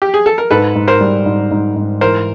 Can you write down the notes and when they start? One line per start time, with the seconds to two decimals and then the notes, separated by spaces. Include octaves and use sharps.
0.02 G4
0.14 G#4
0.26 A4
0.38 A#4
0.51 G#2 A4 B4
0.75 G#2
0.88 A#4 C5
1.01 G3
1.26 G#2
1.51 G#2
1.76 G#2
2.01 E3 A#4 C5